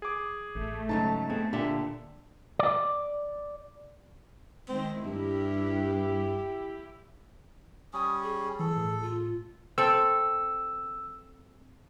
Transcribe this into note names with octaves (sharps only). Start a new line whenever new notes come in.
G#4 D6
A1 A3
G#2 C#3 F#3 D#4 A5
B3 C4 G#4
A#2 D3 D4 G4 E5
D5
D#3 G#3 C4
G2 E4 G4
G3 C#4 D#6
G#4
E3 A4
A2
F4
C4 A4 E6